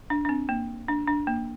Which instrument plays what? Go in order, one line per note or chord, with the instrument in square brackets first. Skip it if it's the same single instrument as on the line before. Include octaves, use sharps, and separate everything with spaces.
[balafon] D4
D4
C4
A#3
D4
D4
A#3